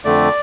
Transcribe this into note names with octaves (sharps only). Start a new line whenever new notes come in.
F2 D3 A3 D5